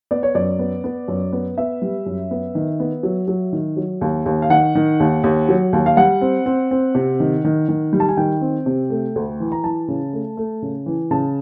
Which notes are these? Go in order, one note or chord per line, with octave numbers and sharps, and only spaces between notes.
B3 D5
C#5
F#2 D5
B3
B3
F#2
B3
B3 E5
G3
F#2
B3
D#3
B3
F#3
F#3
D#3
F#3
D#2
D#2
F5
D#3 F#5
D#3
D#2
D#2
F#3
D#2
F5
G3 F#5
C4
C4
C4
C3
D#3
D#3
D#3
G3
A5
G#5
D#3 G5
C4
C3
A3
D2
E3
A#5
E3 A5
C#3
A3
A3
C#3
E3
C#3 A5